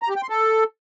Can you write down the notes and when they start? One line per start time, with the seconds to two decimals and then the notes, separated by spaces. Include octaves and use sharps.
0.02 A#5
0.09 G4
0.16 G5
0.23 C6
0.30 A4